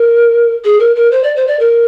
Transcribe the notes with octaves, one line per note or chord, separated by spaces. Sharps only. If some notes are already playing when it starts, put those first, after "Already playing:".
Already playing: A#4
G#4
A#4
A#4
C5
D5
C5
D5
A#4